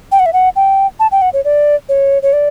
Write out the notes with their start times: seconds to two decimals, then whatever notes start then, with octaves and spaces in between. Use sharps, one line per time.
0.12 G5
0.19 F#5
0.26 E5
0.33 F#5
0.56 G5
1.00 A5
1.12 G5
1.22 F#5
1.33 C#5
1.45 D5
1.89 C#5
2.22 C#5
2.33 D5